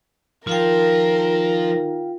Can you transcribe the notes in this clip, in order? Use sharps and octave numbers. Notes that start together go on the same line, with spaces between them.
D#3 F3 F4 A#4 F5 G5